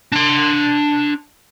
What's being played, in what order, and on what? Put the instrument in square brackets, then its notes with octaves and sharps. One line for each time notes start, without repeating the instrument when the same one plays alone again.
[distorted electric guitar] D4 C6